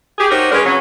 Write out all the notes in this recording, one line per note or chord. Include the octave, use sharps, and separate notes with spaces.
G4 G#4
D#4 F#4 G4 A#4 C5 C#5
G#3 C#4 D4 G#4 A#4 B4
C#3 F#3 C#4